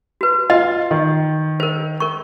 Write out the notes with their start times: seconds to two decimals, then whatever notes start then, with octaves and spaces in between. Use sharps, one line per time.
0.21 F#4 B4
0.50 F4 D#5 F5
0.91 D#3
1.60 A#4 C5
2.00 A#4 C#6